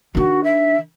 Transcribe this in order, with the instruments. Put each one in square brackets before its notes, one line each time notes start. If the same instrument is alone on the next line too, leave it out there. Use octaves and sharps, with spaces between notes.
[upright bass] D#3 D4 [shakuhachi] F#4
[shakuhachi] E5